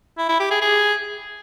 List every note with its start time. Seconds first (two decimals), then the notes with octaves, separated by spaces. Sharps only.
0.18 E4
0.29 E4
0.40 G4
0.51 G#4
0.62 G#4